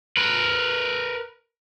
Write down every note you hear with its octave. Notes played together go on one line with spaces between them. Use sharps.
A#4 B4